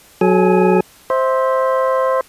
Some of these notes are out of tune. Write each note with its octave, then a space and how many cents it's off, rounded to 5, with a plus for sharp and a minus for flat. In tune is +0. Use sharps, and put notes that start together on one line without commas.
F#3 -5 A4 -45 G#5 +0
C5 +5 E5 -20